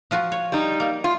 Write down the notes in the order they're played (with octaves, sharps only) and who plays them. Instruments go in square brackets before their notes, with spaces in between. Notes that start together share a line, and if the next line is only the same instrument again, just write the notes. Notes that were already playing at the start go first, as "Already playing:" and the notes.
[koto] F3 F4 F#4
C#5
[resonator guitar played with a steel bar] G3 D#4
[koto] A#3
[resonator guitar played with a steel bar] F4